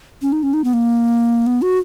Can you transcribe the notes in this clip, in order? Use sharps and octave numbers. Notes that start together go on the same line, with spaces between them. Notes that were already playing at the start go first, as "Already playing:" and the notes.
C#4
D#4
C#4
D#4
B3
A#3
B3
F#4